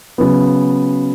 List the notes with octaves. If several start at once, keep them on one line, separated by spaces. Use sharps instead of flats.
C#3 F#3 B3